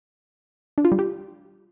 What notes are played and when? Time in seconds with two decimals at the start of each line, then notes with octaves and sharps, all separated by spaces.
0.78 D4
0.85 F4
0.92 G3
0.99 G4